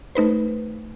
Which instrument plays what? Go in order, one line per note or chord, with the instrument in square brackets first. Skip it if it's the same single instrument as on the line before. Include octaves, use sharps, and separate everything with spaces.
[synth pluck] A3 D#4 B4 C5